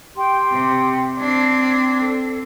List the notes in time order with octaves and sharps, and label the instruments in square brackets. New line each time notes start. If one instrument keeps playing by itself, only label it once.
[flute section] G4 G5 C6
[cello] C3
[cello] C4 D4 [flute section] G#6
[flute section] A4